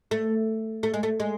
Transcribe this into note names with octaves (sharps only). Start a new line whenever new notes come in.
A3
A3
G#3
A3
G#3